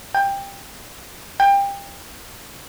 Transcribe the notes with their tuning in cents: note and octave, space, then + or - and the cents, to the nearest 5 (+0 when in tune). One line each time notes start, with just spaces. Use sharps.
G5 +15
G5 +25